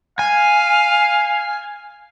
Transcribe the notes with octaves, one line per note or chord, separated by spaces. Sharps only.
F5 G#5